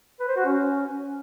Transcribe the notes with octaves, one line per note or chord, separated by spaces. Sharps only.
B4
C5
F#4
C#4